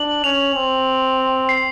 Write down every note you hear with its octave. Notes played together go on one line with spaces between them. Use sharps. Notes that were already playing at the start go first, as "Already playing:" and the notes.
Already playing: D4 F#7
C#4 F7
C4
C7